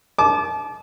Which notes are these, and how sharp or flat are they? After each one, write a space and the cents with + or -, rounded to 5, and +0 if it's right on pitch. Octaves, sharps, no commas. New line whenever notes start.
A5 -35 D6 +0